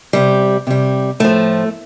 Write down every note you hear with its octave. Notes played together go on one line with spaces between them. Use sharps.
C3 G3
C3 G3
A2 F3 A3